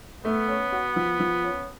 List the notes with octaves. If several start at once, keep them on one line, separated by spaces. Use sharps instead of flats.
A3 B3
C#4
F#4
F3
F3
C#4